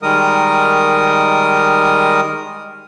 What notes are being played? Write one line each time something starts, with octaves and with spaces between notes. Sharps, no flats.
D#3 G3 G#3 A#4 D#6